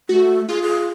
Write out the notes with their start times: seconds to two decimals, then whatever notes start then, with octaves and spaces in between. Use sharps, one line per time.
0.09 A3 F#4
0.49 F4 G#4
0.62 G#4